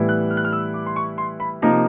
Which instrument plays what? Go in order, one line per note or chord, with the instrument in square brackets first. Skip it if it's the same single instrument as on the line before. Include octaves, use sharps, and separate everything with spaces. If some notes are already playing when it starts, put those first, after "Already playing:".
Already playing: [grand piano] A2 E3 G3 B3 E4
F#6
F6
F#6
F6
E6
D6
C6
C#6
C6
B5
C3 F3 A#3 D#4 A#5